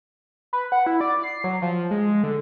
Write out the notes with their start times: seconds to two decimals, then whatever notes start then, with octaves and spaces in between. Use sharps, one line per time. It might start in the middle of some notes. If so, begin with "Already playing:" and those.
0.53 B4
0.72 F#5
0.86 E4
1.01 D5
1.23 C7
1.44 F#3
1.62 F3
1.91 G#3
2.23 D3